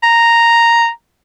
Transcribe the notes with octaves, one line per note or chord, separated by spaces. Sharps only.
A#5